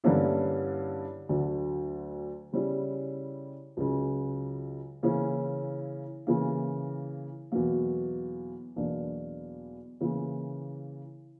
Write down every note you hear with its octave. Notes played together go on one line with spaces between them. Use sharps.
G2 D3 A#3 C#4 E4
D2 D3 F#3
C#3 G3 C#4 E4
C#2 C#3 F#3
C#3 E3 A#3 C#4 E4
C#3 E3 A#3
E2 B2 F#3 A#3
E2 B2 F#3 A#3 D4
C#3 E3 A#3